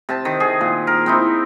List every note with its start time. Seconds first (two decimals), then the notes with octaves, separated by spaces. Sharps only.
0.09 C3 A5
0.25 D#3
0.40 G#4
0.61 A#2
0.87 A#4
1.06 C4 D#4 E4